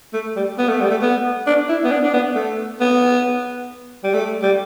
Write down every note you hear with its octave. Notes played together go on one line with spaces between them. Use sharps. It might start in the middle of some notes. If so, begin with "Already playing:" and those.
A3
G3
B3
A3
G3
A3
B3
D4
E4
B3
D4
D4
B3
A3
B3
G3
A3
G3